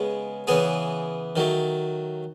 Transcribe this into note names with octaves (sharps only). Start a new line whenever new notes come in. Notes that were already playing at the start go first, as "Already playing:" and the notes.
Already playing: C#3 G#3 B3
C#3 E3 B3 G#4
D#3 F#3 A3